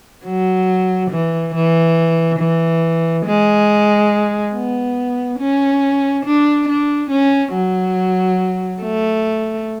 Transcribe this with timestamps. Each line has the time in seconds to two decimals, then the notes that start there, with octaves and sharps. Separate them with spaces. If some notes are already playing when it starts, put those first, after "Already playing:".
0.25 F#3
1.10 E3
1.54 E3
2.39 E3
3.26 G#3
4.54 B3
5.39 C#4
6.25 D4
6.68 D4
7.10 C#4
7.54 F#3
8.82 A3